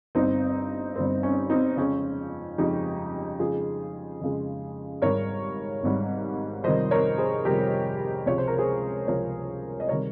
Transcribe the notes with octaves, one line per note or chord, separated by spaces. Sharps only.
G1 G2 G3 C4 D#4
G1 G2 G3 C4
C#4
C4 D#4
F2 C#3 F3 G#3 C#4 F4
F2 C#3 F3 G#3 D#4 G4
F2 C#3 G#3 F4 G#4
F2 C#3 G#3
G#1 G#2 G3 A#4 C#5
G#1 G#2 G3
F2 C3 D#3 G3 C5 D#5
A#4 C#5
G#4 C5
F2 C3 D#3 G3 G4 A#4
C#2 C3 F3 G#3 C#5
C5
A#4
G#4 C5
C#2 C3 F3 G#3 A#4 C#5
D#5
C3 D#3 G3 A#4 C#5